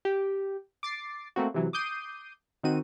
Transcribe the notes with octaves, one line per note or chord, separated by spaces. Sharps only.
G4
D6 A6 C7
A3 A#3 C4 F#4
C3 E3 F#3
D6 D#6 G6 C7 D#7
D#3 C4 F#4 D#7